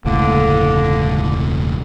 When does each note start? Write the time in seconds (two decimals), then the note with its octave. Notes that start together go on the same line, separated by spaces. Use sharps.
0.05 E1 C#2 A2 D3 A#3